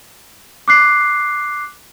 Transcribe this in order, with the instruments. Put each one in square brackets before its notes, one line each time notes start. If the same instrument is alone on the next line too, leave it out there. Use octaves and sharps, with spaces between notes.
[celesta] D6 F#6 C7